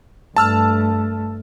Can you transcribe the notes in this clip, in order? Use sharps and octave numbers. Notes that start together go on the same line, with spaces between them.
G2 A3 A5 E6 F6